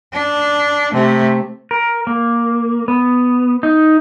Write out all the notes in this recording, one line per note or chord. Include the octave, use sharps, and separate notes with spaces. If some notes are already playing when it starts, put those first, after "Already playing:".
D4
C3 A3
A#4
A#3
B3
D#4